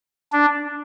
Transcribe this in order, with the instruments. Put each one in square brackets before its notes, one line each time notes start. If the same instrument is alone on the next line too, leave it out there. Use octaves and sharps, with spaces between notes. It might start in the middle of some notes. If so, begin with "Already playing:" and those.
[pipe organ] D4